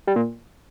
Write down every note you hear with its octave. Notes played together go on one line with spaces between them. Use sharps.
G3
A#2